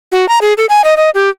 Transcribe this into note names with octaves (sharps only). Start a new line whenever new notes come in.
F#4
A#5
G#4
A4
G#5
D#5
D#5
G4